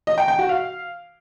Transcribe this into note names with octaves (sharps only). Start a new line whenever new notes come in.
D#5
G5
G5
F#4
F5